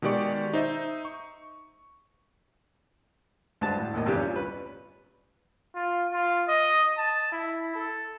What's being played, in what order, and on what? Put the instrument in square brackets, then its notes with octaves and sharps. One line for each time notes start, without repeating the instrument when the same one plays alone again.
[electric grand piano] B2 D#3 G#3 G4 D5 C#6
D#4 C5 D#5 E5
C#6
[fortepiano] G2 G#3 F#4 C5 A5
A2
A1 D#2 D#3 D#5
E2 G2 C3 G4
C#4 F4
G3 B4
[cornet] F4
F4
D#5
A5
E4
A4